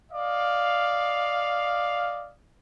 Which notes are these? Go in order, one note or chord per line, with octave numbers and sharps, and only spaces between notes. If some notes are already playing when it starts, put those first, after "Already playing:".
D5 D#5 F5